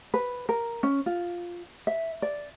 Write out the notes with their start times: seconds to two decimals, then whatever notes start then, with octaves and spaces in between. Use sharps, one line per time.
0.14 B4
0.49 A#4
0.83 C#4
1.06 F4
1.87 E5
2.22 D5